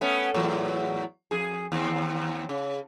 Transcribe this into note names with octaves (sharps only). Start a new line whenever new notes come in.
A3 B3 C#4
E2 A2 F#3
F2 G#4
D#2 C4
C#3